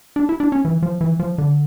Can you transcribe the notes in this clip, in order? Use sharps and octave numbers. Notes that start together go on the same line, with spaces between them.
D4
E4
D4
C#4
E3
F3
E3
F3
D3